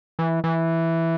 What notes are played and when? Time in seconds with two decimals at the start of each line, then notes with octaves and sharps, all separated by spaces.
0.19 E3
0.44 E3